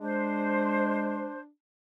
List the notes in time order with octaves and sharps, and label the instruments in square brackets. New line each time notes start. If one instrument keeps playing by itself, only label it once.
[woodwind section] G#3 [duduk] D4 [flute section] C5